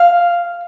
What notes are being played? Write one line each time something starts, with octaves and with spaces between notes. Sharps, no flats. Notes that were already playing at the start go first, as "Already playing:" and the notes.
Already playing: F5